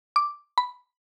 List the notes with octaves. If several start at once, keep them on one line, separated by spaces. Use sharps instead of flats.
D6
B5